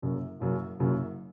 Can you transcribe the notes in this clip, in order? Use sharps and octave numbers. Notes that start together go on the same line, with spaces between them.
F#1 F#2 C#3 F#3
F#1 F#2 C#3 F#3
F#1 F#2 C#3 F#3